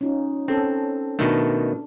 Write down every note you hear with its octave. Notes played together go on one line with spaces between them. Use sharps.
C#4 D#4 F4
C4 C#4 A4
B2 D#3 A3 D4